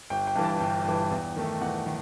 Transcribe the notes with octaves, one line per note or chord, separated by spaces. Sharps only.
G1 G5
G5
G2 E3
A5
G1 G5
G2 E3
E2
D#3 A3
E2 F#5
D#3